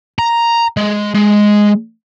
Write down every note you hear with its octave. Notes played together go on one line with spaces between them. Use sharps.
A#5
G#3
G#3